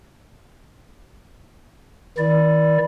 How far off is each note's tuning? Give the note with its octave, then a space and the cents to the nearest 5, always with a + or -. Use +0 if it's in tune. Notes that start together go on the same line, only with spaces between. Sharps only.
D#3 +35 E4 -15 D5 +0